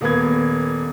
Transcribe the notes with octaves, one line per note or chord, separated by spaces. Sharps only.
D#1 A#3 B3 G#6